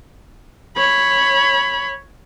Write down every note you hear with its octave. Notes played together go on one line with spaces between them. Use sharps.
C#5 B5